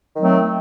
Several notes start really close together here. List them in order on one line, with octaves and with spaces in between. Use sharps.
D#3 F#3 C4 A3